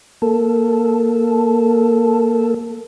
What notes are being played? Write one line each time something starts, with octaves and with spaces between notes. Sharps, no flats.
A#3 A4